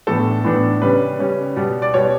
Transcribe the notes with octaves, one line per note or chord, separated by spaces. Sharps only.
A2 E3 B3 D4 A4
A2 E3 B3 D4
C#3 G3 C#4 B4
C#3 G3 C#4
B2 G3 B3
D5
B2 G3 B3 C#5